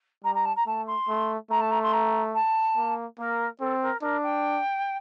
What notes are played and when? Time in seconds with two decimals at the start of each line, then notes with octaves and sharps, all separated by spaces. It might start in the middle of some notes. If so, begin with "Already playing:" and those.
0.23 G3 A#5
0.34 A#5
0.45 A5
0.56 A#5
0.66 A3 A5
0.86 C6
1.08 A3
1.50 A3 A#5
1.60 A5
1.71 A#5
1.82 C6
1.93 A#5
2.34 A5
2.77 A#3
3.18 A#3 A#4
3.60 C4 A4
3.82 A#4
4.02 D4 A#4
4.23 G5